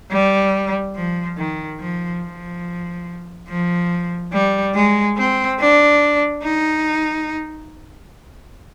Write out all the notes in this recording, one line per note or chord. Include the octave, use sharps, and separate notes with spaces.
G3
F3
D#3
F3
F3
F3
G3
G#3
C4
D4
D#4